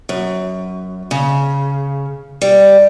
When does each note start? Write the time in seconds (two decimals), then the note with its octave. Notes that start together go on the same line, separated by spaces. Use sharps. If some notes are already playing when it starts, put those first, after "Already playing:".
0.09 F#2
1.11 C#3
2.41 G3